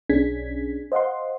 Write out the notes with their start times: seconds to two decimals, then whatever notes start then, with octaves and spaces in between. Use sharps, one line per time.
0.09 B1 C#4 D4 G#4 G#6 B6
0.92 C5 D#5 F5 F#5 C6